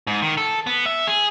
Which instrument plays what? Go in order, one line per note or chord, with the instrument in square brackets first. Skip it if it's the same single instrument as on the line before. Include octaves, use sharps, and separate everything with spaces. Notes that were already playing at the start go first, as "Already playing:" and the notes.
[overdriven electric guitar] G#2
D#3
A4
B3
E5
G#4